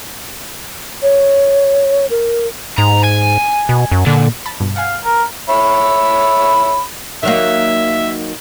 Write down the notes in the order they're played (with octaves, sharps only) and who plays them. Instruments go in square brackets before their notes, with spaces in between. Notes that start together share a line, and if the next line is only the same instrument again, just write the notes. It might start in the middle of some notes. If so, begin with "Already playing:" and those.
[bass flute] C#5
A#4
[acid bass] G#2 [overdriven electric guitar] A#5
[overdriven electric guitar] G#5
[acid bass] B2
F#2
[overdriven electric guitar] A#2 [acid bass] D3
[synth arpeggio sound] A5 B5
G2 B2
[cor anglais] F5 [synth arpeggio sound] F#5 G#5
[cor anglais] A#4
[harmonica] C#5 E5 B5
[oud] D#3 F#3 A#3 [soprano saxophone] E5